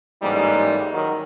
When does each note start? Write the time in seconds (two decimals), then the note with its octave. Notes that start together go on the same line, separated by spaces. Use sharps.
0.23 A1 G#2 G3 A#3 D#4
0.93 D#3 F#3